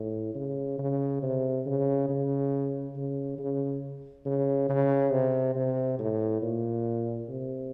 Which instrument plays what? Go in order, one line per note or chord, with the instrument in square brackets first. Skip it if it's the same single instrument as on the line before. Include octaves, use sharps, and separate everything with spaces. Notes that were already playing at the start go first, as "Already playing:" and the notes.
Already playing: [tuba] A2
C#3
C#3
C3
C#3
C#3
C#3
C#3
C#3
C#3
C3
C3
A2
A#2
C3